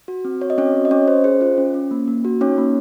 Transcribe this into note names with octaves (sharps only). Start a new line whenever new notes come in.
F#4
C4
F#4 C#5
D#5
C4 C#4 C#5
F#4
D#5
C#4 C#5
C#4 C5
G#4 C5
F4
C#4
C#4
A#3
A#3
F#4
C#4 D#4 C#5
A#3